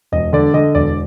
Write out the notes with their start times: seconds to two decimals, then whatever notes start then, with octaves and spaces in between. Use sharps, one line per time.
0.12 E1 D#5
0.33 D3 D5
0.54 D3 D#5
0.75 E1 D5